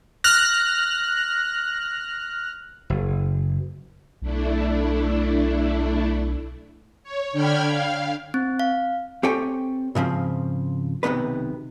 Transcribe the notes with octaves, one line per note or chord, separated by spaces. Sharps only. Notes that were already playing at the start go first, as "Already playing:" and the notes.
F6 F#6 A#6
F#1
B1 A3 D4 E4
C#5
D3 D4 G5 B5 F6 G#6
F5
C4
F5
C4 G4 A4 C#5 G5 G#5
G#2 C#3 F3 C4
B1 C3 D#3 B3 B4